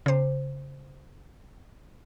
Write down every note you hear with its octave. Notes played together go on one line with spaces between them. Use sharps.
C#3 C5